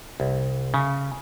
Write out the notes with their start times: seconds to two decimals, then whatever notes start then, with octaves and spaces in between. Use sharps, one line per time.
0.20 C2
0.74 C#3